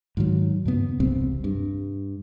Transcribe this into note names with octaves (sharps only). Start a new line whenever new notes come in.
G#2 D#3 F#3
G2 C#3 B3
E1 C2 C3 C4
G2